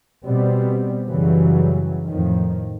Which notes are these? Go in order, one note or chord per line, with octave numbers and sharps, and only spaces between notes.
B2 G3 B3 C4
F#2 C#3 E3 F#3 G3
F2 A2 D#3 F3